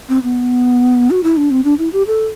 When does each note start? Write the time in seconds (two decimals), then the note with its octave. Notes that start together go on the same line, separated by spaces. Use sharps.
0.09 C4
0.23 B3
1.11 F#4
1.23 E4
1.37 D4
1.51 C4
1.65 D4
1.79 E4
1.93 G4
2.07 A4